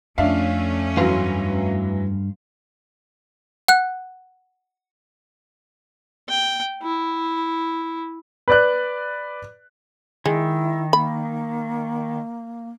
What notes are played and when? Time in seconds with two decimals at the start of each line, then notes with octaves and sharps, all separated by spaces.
0.18 F2 A3 C#4 D4 E5 F5
0.97 G2 E3 F#3 F5 C6
3.68 F#5 F#6
6.30 G5
6.82 E4
8.48 B4 D5 F#6
10.26 D#3 G#3 E4
10.93 A#3 B5